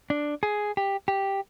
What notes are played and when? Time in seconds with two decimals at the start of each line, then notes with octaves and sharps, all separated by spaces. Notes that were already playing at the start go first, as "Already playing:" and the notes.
0.10 D4
0.43 G#4
0.77 G4
1.08 G4